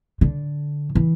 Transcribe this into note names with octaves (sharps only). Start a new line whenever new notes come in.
D3
E3